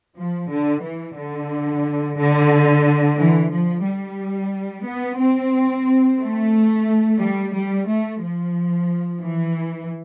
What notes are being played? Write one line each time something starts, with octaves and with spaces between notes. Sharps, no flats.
F3
D3
E3
D3
D3
E3
F3
G3
B3
C4
A3
G3
G3
A3
F3
E3